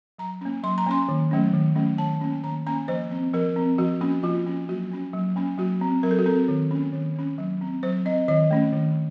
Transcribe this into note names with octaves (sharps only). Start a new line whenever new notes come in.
F#3 A#5
A#3 C#4
F#3 C6
A#5
A#3 C#4 C6
D#3
F#3 A3 C#4
D#3
F#3 A3 C#4
D#3 A5
A#3 C#4
D#3 A#5
A#3 C#4 A#5
F3 C5
C4
F3 A#4
C4
F3 F#4
A#3 C#4 F#4
F3 F4
A#3 C#4
F#3 F#4
A#3 C#4
F#3
A#3 C#4
F#3 F#4
C4
F#3 A#4
A4
F#4
C4 A4
D#3
A#3 C#4
D#3
A#3 C#4
F#3
C4
F#3 C5
C4 D#5
D#3 D#5
A3 C#4
D#3